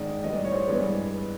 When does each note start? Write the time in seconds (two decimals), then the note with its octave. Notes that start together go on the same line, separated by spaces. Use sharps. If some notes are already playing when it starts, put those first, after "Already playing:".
Already playing: G#2 D#3 G#3 D5
0.24 A2 E3 G3 B3 D#5
0.34 D5
0.45 C#5
0.52 C5
0.56 C#5
0.67 G2 E3 G#3 B3 D5